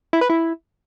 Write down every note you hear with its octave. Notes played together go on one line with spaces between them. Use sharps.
E4
B4
E4